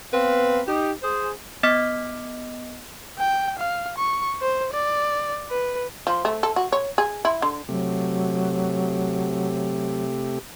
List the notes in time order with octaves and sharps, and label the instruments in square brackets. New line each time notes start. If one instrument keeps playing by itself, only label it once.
[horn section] B3 C4 B4 F5
D#4 G4
G#4 C5
[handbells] B3 D#5 D6 F6 B6
[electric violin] G5
F5
C#6
C5
D5
B4
[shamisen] F3
A3
A4
F#4
C#5
G#4
E4
D3
[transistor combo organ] C3 A3 G4 [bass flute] F#3